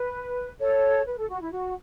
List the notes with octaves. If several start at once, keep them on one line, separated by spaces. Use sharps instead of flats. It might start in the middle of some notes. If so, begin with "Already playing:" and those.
Already playing: B4
A4 C#5
B4
A4
F#4
E4
F#4